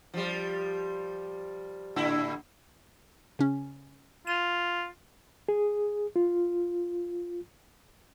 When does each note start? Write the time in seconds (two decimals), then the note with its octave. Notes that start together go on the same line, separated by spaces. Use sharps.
0.14 F3 G3
1.96 A2 D3 E4
3.39 C#3 C#4
4.27 F4 D#7
5.49 G#4
6.16 F4